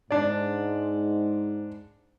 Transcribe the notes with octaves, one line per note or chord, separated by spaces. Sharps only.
G#2 D4 D5